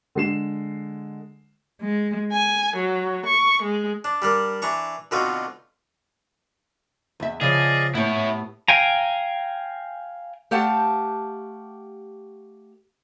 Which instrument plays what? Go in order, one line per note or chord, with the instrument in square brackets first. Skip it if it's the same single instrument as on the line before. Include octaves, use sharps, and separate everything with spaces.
[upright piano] D3 G#3 C7 E7
[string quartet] G#3
G#5
F#3
C#6
G#3
[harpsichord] D4
G3 D4 A#4
E3 D4 A#5 C#6
B2 D3 C4 D#4 F4 F#4
[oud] E2 E5
[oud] C#3 F3 [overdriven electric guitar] G#4 [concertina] D5 D#5 F5
[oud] A2 G4 [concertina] B3 [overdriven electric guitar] E4 C#5
[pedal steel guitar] F5 G5 G#5 A#5
[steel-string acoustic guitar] A3 G4 F5 F#5 A5